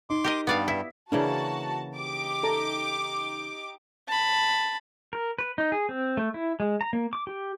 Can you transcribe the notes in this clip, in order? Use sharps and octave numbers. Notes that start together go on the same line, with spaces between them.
D#4 C6 D6
G4 A#4 D#5
G2 G3 B3 D5 F5
E4 B6
C#3 E3 A#3 D4 F#4 A5
D#4 G4 D6
A4 A5 A#5
A5 B5
A#4
B4
D#4
G#4
C4
A3
E4
G#3
A#5
A#3
D6
G4